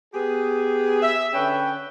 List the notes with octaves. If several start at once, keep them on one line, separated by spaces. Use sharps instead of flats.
B3 G4 G#4
E5
D3 C#4 B4 C#5 G5